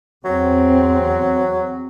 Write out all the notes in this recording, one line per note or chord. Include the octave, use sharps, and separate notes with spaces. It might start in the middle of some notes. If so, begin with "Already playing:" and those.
E2 F#3 C4